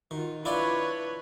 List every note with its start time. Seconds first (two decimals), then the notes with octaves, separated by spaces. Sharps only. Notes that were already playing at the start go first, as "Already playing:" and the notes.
0.11 D#3 F4 F#4
0.45 D4 E4 F4 B4 C#5 D5 B5